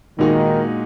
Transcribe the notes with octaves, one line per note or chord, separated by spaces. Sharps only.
A#2 D#3 G#3 D#4 F#4